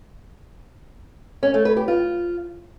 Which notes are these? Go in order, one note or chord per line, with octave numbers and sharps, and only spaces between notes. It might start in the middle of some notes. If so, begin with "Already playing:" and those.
C#4
A3
B4
G4
F4